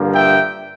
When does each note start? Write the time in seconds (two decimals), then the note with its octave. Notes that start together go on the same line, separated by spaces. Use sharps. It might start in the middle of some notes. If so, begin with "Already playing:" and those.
Already playing: G2 D3 F3 A#3
0.13 E5 G5